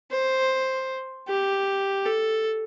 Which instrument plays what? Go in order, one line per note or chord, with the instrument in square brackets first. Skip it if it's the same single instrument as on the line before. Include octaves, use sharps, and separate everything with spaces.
[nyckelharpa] C5
G4
A4